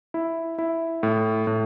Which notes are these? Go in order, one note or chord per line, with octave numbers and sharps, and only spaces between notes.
E4
E4
A2
A2